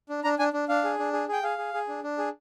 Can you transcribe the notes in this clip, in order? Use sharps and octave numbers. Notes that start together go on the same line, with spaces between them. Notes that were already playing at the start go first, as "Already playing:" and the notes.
D4
D4 A#5
D4 G#5
D4
D4 F5
G#4
D4
G#4
G#4 G5
G#4 F5
G#4
G#4
D4
D4
G#4